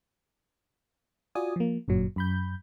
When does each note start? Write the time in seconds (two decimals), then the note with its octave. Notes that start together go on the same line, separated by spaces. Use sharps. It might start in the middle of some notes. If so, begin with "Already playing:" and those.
1.35 F4 F#4 D5 G#5 D#6
1.56 F3 A#3
1.88 G1 F#2 A#2 F#3
2.16 F#2 B5 G6